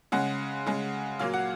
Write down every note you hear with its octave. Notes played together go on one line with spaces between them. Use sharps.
C#3 G#3 F#5
C#3 G#3
A#2 F#3 A#3 F5
F#5